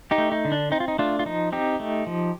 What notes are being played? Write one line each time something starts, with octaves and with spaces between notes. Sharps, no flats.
D#4 G4
A3
D#4
D3
D4
C4 D#4
F4
D#4
A3 D4 F4
F4
F3 D#4
C4 D#4 G4
A3
F3